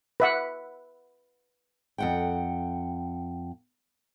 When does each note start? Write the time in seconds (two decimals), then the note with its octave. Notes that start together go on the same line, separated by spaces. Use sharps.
0.20 B4 E5 F#5
1.98 F2 F#5 G5